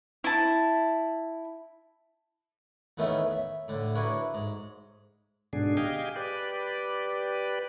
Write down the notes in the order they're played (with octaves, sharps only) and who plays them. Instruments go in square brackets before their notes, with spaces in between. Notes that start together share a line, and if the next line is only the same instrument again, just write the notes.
[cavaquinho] E4 A5
[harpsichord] E2 D#3 A3 B3 C#4 E5
E5
A2 D3
D4 E4 F#4 A#4 B4 C#5
G#2
[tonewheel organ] G#2 B2 D3 D4 G#4
G4 G#4 D#5 F5 G5 G#5
G4 B4 D5